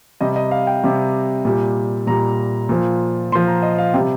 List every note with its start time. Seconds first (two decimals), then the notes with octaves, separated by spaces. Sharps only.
0.21 C3 G3 D#5
0.36 D#5
0.51 F5
0.67 G5
0.84 C3 G3
1.45 A#2 G3
2.07 A#2 G3 A#5
2.69 A#2 F3
3.32 A#2 C6
3.35 F3
3.47 A#5
3.62 D#5
3.78 F5
3.94 C3 G3 G5